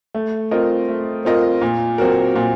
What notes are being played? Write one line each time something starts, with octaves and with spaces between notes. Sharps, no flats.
A3
C4 F4 A#4 D#5
A3
C4 F4 A#4 D#5
A#2
F#3 C4 F#4 A#4
A#2